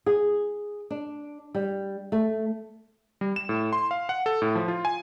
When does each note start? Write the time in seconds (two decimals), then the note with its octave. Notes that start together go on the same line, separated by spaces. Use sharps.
0.06 G#4
0.91 D4
1.55 G3
2.12 A3
3.21 G3
3.36 E7
3.49 A2
3.73 C6
3.91 F5
4.09 F#5
4.26 A4
4.42 A2
4.55 F3
4.68 F4
4.85 G#5